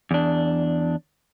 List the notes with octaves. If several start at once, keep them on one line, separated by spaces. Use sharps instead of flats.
E2 D4